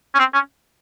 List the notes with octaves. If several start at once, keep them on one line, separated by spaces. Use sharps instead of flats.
C#4
C4
C#4